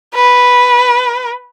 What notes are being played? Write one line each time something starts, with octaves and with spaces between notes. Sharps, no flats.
B4